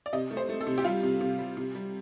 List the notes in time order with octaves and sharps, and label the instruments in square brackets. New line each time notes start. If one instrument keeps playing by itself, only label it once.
[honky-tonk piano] D5
C3 D#5
A3
C5
A3
A4
C3
G4
G3 F4
C3
C3
G3
C3
G3